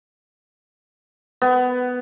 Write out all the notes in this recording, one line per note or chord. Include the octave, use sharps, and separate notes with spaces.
B3